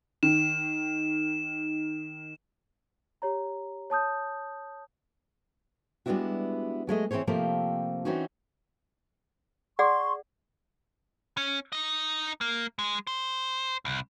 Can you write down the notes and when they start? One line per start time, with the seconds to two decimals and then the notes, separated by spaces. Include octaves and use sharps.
0.23 D#3 E7
3.22 G4 C#5 A#5
3.90 C#5 A5 D#6 G6
6.06 G3 G#3 B3 D4 E4 F#4
6.87 F#3 G#3 A3 D#5
7.11 E3 C4 G#4 C5 C#5
7.27 C3 F3 A3 A#3 C4 G4
8.05 E3 C4 C#4 D#4 F#4
9.79 G#4 D5 F#5 C6 C#6
11.37 C#4
11.73 D#4 D#5
12.41 A#3
12.79 G#3
13.07 C5
13.85 C2